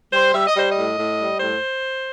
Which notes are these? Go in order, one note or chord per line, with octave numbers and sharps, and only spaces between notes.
G3 C5
G3 E5
D#5
G3 C5
A2 D#5
A2
G3
A2 C5